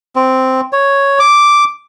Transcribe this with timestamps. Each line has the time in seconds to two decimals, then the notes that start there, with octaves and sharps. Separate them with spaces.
0.16 C4
0.73 C#5
1.19 D6